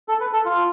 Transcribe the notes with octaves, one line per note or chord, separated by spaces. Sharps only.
A4
B4
A4
F4